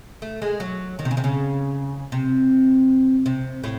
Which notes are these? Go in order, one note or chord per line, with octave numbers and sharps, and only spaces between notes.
A3
G#3
F#3
D#3
C3
C#3
C3
C#3
C3
C3
A2